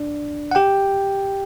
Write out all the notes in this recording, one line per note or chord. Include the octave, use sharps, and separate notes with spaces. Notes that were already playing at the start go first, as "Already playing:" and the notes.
Already playing: D4 D5
F#5
G4 G5